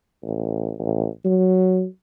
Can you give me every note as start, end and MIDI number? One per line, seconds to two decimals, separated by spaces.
0.23 0.73 33
0.79 1.07 33
1.25 1.85 54